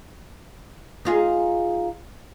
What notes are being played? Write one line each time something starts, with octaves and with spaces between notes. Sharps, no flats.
D#4 F4 G#4